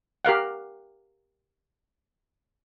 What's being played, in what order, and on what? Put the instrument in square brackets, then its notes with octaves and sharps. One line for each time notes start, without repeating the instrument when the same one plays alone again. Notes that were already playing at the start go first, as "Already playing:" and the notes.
[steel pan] G4 A#4 F5 F#5